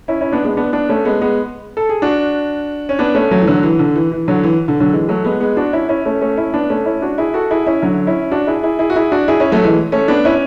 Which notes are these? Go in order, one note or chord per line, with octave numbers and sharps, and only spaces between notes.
C#4 E4
C#4 E4
B3 D4
G#3 B3
B3 D4
B3 D4
A3 C#4
G#3 B3
G#3 B3
A4
G#4
D4 F#4
C#4
B3 D4
A3 C#4
F#3 A3
E3
D3 F#3
E3
D3
E3
E3
D3 F#3
E3
D3
D3 F#3
E3 G#3
F#3 A3
G#3 B3
G#3 B3
D4 F#4
C#4 E4
C#4 E4
A3 C#4
A3 C#4
C#4 E4
B3 D4
A3 C#4
C#4 E4
D4 F#4
E4 G#4
F#4 A4
E4 G#4
C#4 E4
D3 F#3
C#4 E4
D4 F#4
E4 G#4
E4 G#4
E4 G#4
F#4
E4 G#4
D4 F#4
E4 G#4
C#4 E4
F#3 A3
E3 G#3
A3 C#4
B3 D4
C#4 E4